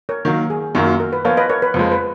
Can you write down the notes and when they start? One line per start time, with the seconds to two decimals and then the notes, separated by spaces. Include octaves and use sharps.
0.09 A#4 C#5
0.25 D#3 F#3 A#3 A#4
0.50 G#4
0.75 F#2 D#3 F#3 A#3 F4 F#4
0.87 F#4
1.00 A#4
1.13 B4
1.25 F3 B3 F4 A#4 C#5
1.37 B4 D#5
1.50 A#4 C#5
1.62 B4
1.74 F2 F3 G#3
1.92 B4